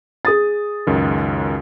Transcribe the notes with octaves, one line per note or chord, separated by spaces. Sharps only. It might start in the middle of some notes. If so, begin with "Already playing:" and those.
G#4 D#6 A6
C#2 F#2 D#3